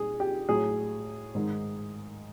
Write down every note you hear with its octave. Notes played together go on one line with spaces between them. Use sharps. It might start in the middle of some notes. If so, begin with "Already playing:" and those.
Already playing: A#2 G3 G#4
G4
A2 F#3 G#4
G#2 D#3 G#3